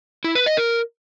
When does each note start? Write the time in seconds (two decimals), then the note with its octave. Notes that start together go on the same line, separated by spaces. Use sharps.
0.24 E4
0.35 B4
0.46 D#5
0.57 A#4